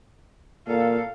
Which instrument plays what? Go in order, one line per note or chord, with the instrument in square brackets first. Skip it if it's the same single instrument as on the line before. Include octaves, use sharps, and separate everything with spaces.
[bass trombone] A#2 [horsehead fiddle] A4 F5